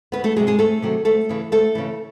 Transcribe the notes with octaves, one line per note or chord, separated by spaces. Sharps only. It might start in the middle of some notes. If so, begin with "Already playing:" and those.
D2 B3 B4
A3 A4
C3 D#3 F#3 G#3 G#4
G#3 G#4
D2 A3 A4
C3 D#3 F#3
D2 A3 A4
C#3 E3
D2 A3 A4
C#3 E3